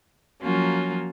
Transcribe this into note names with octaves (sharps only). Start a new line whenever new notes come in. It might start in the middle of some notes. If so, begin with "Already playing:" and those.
F3 F#3 A#3 C#4 F4 F#4